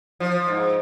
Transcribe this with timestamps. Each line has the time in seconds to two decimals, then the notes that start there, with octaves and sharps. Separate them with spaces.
0.20 F3
0.48 G#2